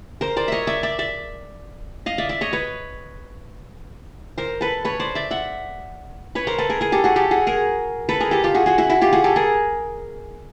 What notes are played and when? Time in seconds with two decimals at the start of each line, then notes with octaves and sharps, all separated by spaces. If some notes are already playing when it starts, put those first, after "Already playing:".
0.21 A#4 C5
0.37 C5 D5
0.48 C#5 D#5 E5
0.67 D5 E5
0.83 D5 E5
0.99 D5 E5
2.06 D#5 F5
2.18 D5 E5
2.29 D5 E5
2.41 C#5 D#5
2.53 B4 C#5
4.38 A#4 C5
4.61 A4 B4
4.85 B4 C#5
5.00 C5 D5
5.15 D5 E5
5.31 E5 F#5
6.35 B4 C#5
6.47 A#4 C5
6.58 A4 B4
6.69 G#4 A#4
6.81 G#4 A#4
6.92 G4 A4
7.04 F#4 G#4
7.16 G4 A4
7.31 F#4 G#4
7.47 G#4 A#4
8.09 A4 B4
8.20 G#4 A#4
8.31 G4 A4
8.44 F4 G4
8.54 F#4 G#4
8.66 F#4 G#4
8.78 E4 F#4
8.90 E4 F#4
9.01 F4 G4
9.13 F#4 G#4
9.24 G4 A4
9.36 G#4 A#4